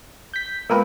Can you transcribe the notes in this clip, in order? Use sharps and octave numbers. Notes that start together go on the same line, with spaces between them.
G6 B6
G#3 A#3 B3 F4 A#4 B4